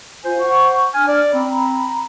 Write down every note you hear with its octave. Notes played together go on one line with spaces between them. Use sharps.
F4 C5 G#5
F#5 C#6
D4 G#5 F6
D5
C4 A#5 B5